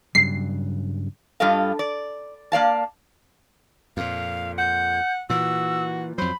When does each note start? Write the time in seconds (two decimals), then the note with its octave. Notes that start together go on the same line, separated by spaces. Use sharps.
0.15 G2 C#3 F#3 C7
1.40 G2 G3 F4 A4 D#5 F5
1.79 D5
2.52 A#3 D5 F5 A5
3.97 F2 A#2 F5
4.58 F#5 G6
5.30 A#2 E3 F#4 E6
6.18 F2 F#3 C5 B5